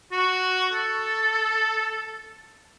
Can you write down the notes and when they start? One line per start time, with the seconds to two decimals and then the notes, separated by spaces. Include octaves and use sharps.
0.12 F#4
0.73 A4